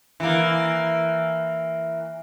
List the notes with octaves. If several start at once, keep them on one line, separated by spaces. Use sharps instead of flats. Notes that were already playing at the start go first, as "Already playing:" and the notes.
E3 A#3